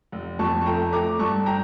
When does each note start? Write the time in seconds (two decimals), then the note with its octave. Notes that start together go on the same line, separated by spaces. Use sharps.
0.12 F1
0.39 F2 A5 C#6
0.61 C#6
0.66 A3 G5 A#5
0.92 A3 A#5 D6
1.19 G2 A5 C#6
1.46 G5 A#5